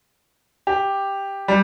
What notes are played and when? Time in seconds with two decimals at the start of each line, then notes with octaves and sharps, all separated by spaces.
0.67 G4
1.48 G3